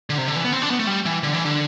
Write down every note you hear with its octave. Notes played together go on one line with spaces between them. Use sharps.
D3
C3
D3
E3
B3
C4
D4
B3
A3
G3
E3
D3
E3
D3